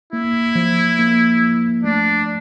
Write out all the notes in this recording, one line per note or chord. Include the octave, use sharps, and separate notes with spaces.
A#3 E4
F3
A#3
F3
A3 D4